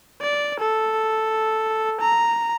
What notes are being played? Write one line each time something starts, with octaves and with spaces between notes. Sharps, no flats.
D5
A4
A#5